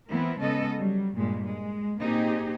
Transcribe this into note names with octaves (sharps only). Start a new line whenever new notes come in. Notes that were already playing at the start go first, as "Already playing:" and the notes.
E3 B3 C4 E4 A#4
C#3 G#3 B3 C#4 A4 D#5
F#3 G3
G2 A#2 G3 G#3
G#3
A#2 A#3 C4 D#4 G4 G#4